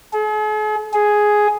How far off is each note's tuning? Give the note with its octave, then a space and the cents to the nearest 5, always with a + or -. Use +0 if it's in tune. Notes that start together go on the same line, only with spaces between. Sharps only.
G#4 +45
G#4 +5